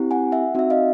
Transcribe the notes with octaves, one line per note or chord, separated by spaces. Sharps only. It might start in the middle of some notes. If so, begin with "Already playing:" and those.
Already playing: C4 E4 G4
F#5 G#5
E5 F#5
C4 D#4 F#4 E5
D#5 F5